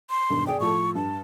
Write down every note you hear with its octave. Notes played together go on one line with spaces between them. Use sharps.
C6
E1 G2 D#3
G#4 D5 G5
A2 F3 A4 C#6
G2 A5